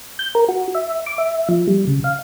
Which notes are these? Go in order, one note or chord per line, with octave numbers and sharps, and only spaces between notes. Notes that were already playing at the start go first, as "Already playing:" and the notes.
G6
A#4
F#4
E5
D6
E5
F3
G3
C#3
F5